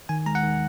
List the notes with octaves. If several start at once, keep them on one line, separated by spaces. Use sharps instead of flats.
D#3 G#5
G#3 A#5
F#5
D#3